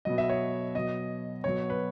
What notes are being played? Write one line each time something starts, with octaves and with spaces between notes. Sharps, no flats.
B2 F#3 D#5
E5
C#5
B2 F#3 D#5
B2 F#3 C#5
B4